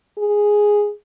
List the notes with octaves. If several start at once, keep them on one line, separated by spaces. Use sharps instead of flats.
G#4